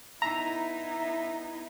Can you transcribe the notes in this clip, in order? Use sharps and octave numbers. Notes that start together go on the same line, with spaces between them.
B3 D#4 E4 E5 A#5